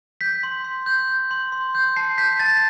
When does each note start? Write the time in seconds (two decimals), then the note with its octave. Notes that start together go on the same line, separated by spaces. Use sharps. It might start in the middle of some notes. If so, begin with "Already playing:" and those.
0.21 G6 B6
0.43 C6
0.64 C6
0.86 G6
1.08 G6
1.31 C6
1.52 C6
1.75 G6
1.96 A5 C7
2.18 G6 B6
2.39 A5 A6